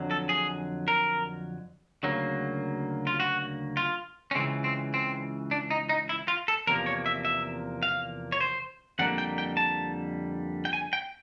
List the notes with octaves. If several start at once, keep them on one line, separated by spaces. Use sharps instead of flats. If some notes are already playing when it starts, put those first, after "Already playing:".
Already playing: F2 D3 F#3
A4
G#4
A#4
D2 C#3 F#3 A#3
F4
F#4
F4
C#4
C#2 C#3 E3 C4
C4
C4
D4
D#4
D#4
E4
F4
A4
E2 C3 F3 A#3 A#4
C#5
E5
E5
F5
C#5
C5
F2 D3 G3 A#3 F#5
G5
G5
A5
G5
G#5
G5